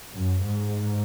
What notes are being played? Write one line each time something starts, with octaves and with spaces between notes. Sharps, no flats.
F#2
G#2